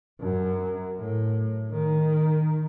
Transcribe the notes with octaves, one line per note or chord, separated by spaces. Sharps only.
F#2
A2
D#3